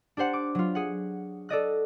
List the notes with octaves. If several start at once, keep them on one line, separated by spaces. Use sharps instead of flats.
D4 G4 C5 F#5
D6
F#3 F4
G#4 F#5
A4 D5 D#5 F#6